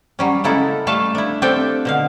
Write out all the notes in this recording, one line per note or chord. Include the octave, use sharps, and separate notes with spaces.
F#3 G3 C#4
C#3 G#3 A#3 E4 A4
G3 A3 A4 F5 A5
D4 E4
C4 D4 F4 G4 A4 G5
B2 D3 F5